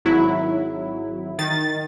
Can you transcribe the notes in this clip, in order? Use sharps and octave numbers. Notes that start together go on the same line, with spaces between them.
G#1 F#3 E4
D#3 A6